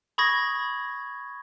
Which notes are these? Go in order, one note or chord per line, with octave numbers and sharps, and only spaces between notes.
B5 C#6 D#6 G#6 A#6